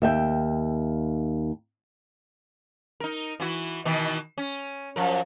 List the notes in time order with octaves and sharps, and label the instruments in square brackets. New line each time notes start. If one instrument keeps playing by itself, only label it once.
[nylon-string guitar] D#2 E5 G5
[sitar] D#4 A#4
E3 E4 F#4
B2 D#3 E3
C#4
F#2 F3 A#4